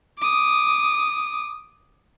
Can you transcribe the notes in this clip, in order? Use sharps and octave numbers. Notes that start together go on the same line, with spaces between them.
D6 D#6